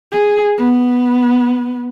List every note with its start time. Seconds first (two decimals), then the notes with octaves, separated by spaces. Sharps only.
0.11 G#4
0.58 B3